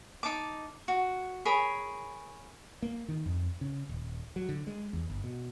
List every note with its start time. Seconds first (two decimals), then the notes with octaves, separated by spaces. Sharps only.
0.23 D#4 A5 D6
0.88 F#4
1.45 G#4 A#4 C#5 B5
2.82 A#3
3.08 D#3
3.26 F2
3.61 C#3
3.89 D#1
4.36 F#3
4.49 D3
4.67 G#3
4.93 E2
5.10 G1
5.24 B2